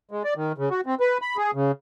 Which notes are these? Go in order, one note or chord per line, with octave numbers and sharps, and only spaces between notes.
G#3
D5
D#3
C#3
F#4
C4
B4
B5
G#4
C#3